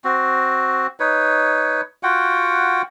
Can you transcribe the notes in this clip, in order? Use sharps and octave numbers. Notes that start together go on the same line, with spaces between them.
C4 F#4
D#4 B4 C#5
F4 F#4 F#5 G5